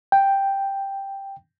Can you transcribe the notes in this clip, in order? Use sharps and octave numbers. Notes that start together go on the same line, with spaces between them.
G5